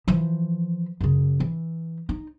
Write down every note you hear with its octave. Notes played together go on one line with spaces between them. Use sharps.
E3 F3
F#2 C#3
E3
D#4